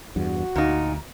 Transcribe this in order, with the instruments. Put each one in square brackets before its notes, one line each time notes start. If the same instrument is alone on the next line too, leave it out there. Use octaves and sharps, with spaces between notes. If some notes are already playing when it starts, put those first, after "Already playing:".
[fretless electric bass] E2 G2 [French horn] F#4
[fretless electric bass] D2 [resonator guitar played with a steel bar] A#2 D#4